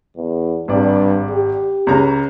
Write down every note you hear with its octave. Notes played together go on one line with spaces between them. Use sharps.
E2
G#1 G2 D5
G4
C#2 C#4 A#5